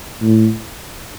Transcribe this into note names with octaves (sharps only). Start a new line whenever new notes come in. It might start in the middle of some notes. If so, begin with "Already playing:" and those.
A2